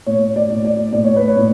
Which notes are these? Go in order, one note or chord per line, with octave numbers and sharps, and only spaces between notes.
A2 C#5
D5
A2
D5
A2 D5
C#5
B4
C#5
A2